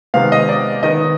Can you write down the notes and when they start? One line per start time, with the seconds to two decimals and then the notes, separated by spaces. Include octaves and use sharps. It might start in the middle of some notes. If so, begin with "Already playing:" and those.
0.14 C3 D#3 G#3 B3 F5
0.32 D#5
0.49 D5
0.83 D#3 B3 D#5